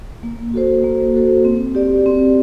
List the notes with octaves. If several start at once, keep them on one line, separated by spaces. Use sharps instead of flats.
A#3
F#4 A4 C5
A#3
F#4 A4 C5
C4
G4 D5
C4